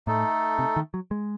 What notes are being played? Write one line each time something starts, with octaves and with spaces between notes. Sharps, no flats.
A2 A3 D#4 A4
C3
D#3
F#3
G#3